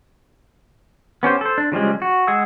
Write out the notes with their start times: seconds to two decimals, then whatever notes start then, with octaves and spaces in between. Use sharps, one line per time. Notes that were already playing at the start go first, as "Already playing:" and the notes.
1.23 B3 C#4 G4 C5
1.41 A4 C5
1.58 D4
1.72 C#3 F3 G3 G#3
2.02 F#4
2.27 G#3 G#4 F#5 E6